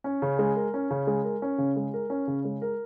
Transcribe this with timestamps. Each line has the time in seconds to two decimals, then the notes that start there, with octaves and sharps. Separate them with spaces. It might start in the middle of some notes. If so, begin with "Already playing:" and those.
0.04 C#4
0.22 C#3
0.39 G#3
0.56 A#4
0.74 C#4
0.90 C#3
1.07 G#3
1.24 A#4
1.42 C#4
1.58 C#3
1.76 G#3
1.94 A#4
2.10 C#4
2.27 C#3
2.45 G#3
2.62 A#4